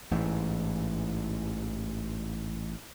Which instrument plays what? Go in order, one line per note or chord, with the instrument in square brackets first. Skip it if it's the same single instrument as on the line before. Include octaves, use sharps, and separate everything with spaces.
[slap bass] A1 G#2 E3